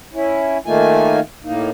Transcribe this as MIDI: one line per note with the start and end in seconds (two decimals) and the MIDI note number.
0.14 0.58 61
0.14 0.58 64
0.66 1.20 51
0.66 1.20 57
0.66 1.20 58
0.66 1.20 63
0.66 1.20 65
0.66 1.20 80
1.44 1.70 45
1.44 1.70 58
1.44 1.70 63